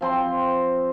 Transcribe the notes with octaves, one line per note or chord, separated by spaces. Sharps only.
F3 C4 C6